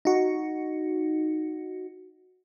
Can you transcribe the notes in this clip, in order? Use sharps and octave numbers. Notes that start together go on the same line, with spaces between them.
D#4 F#4